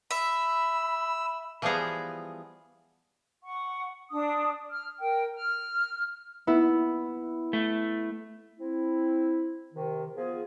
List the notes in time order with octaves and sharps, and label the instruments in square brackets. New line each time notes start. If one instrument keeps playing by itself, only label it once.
[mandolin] E5 [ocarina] B5 [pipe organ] E6
[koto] E3 F3 G3 B3 G#4 A#5
[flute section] F#5 C#6
D4 D#6
F6
A#4 G5
F6
[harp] B3 E4
[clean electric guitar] A3
[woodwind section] C4 E4
C3 D#3
F3 B3 F4 G#4